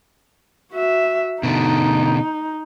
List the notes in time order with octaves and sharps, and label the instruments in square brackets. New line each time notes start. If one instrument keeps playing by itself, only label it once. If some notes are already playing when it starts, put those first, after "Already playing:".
[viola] F#4 E5
[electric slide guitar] B2 D3 [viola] D#4